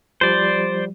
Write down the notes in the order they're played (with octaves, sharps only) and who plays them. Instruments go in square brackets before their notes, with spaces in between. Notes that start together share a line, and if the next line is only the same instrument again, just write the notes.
[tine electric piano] F3 G3 [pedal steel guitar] C5 D5